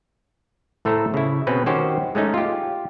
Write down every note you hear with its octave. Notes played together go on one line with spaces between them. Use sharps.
A2 A3 A4 C5 A#5
C#3 E4
B2 C4 C#4 B4
D#3 C#4 F#4 G4 C5
G#3 A3 C#4 D#4
F4 G4